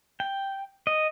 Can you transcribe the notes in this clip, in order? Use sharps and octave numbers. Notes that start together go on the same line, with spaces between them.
G5
D#5